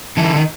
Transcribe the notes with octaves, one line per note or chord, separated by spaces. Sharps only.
D3 E3
D#3